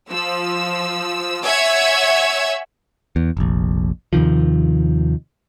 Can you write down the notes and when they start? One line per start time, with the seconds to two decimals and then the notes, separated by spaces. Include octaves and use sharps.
0.10 F3 E6
1.44 C#5 E5 F#5 G#5 E6 G#6
3.16 E2
3.37 F1 A#1
4.13 D#2 C3 D#3 F3